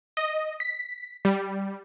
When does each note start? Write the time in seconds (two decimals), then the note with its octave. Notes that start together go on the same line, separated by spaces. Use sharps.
0.17 D#5
0.60 B6
1.25 G3